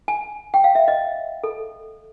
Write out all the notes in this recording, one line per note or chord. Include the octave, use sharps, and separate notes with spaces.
G#5
G5
F5
E5
D#5
A4